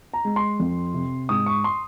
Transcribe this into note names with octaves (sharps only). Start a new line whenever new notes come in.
A#5
G#3
C6
F2
C3
G#2 D#6
C#6
C6